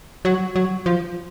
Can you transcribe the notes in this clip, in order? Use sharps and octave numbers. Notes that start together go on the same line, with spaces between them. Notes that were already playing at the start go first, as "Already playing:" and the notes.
F#3
F#3
F3